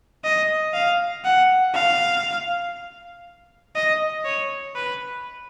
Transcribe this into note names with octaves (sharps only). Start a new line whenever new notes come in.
D#5
F5
F#5
F5
D#5
C#5
B4